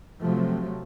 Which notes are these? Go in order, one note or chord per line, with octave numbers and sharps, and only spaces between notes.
C3 F3 F#3 A3